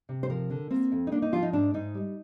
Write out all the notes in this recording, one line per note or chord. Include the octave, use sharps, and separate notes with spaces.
C3
C5
F3 A#4
D3
A#3 C4
F2
D#4
A#3 D4
D#4
F3 F4
D#4
G#2 D4
G#2 D#4
G3